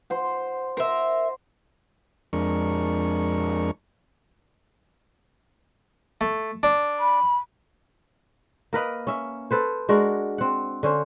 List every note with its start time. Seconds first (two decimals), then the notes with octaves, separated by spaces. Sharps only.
0.10 C5 F#5
0.77 A#4 C5 E5
2.33 F2 G#3 D4 A#4 C#6
6.21 A3
6.63 D4
7.00 B5
8.73 A#3 A#4 B4 D#5
9.07 C#4 E5
9.51 A4 B4 C5
9.89 G#3 D4 F#4 A#4
10.38 C4 F#5
10.83 D3 C#4 C5